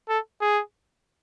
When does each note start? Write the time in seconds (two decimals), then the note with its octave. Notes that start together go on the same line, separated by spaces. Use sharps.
0.09 A4
0.41 G#4